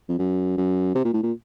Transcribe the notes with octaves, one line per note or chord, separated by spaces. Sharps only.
F2
F#2
F#2
C3
A#2
A2
A#2